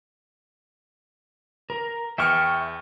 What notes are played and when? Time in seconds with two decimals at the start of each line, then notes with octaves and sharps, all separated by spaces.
1.70 A#4
2.18 E2 E5 G5 C#6 F6 C#7